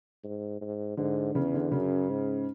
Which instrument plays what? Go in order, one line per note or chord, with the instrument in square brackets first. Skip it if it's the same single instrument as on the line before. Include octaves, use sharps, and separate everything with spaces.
[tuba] G#2
G#2
[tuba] G#2 [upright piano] D3
[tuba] E2 [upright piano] C#3
[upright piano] D3
[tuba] F#2 [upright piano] C#3
[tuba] G#2